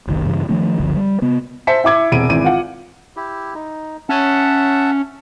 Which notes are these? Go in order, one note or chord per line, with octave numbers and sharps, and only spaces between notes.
F#1 C2 D#3
G2 C#3 E3
D#3 F3 A3 D4
G1 C#2 D3 F3
G3
C3 B3
C5 E5 A5 B6 C#7
E4 E5 D6 G#6
E1 C3 D7 D#7
G#1 E3 D#7
F4 F5 F#5
E4 G4
D#4
C#4 E5 F#5 A5